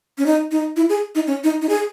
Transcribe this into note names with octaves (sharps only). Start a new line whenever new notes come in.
C#4
D#4
D#4
E4
G#4
D#4
C#4
D#4
D#4
G#4